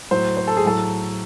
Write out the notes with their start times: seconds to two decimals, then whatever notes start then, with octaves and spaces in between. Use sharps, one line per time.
0.11 A2 F#3 C5
0.37 C5
0.47 A4
0.57 G#4
0.64 A2 F#3 A4